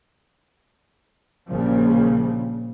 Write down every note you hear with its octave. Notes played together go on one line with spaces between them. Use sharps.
A#1 A#2 C#3 F3 G3